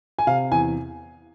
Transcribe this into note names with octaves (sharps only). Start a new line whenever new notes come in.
G#5
C3 F5
E2 G#5